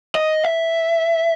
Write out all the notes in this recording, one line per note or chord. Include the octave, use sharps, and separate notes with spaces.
D#5
E5